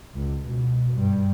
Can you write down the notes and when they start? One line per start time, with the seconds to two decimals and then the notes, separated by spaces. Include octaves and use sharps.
0.15 C#2
0.46 B2
0.94 G2